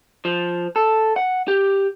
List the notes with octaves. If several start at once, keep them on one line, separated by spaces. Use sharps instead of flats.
F3
A4
F#5
G4